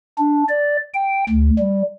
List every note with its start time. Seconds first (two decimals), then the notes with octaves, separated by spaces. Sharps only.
0.18 D4
0.49 D5
0.94 G5
1.29 D2
1.59 G3